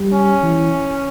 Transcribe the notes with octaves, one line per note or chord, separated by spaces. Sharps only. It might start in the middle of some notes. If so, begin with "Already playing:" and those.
Already playing: G3
C#4
E3